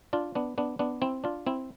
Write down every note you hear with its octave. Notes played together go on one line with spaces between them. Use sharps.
D4 F4
B3 D4
B3 D4
B3 D4
C4 E4
D4 F4
C4 E4